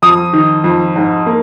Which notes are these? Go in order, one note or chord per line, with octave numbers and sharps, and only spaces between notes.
F2 D#6
D#3
F2
G#2
A#3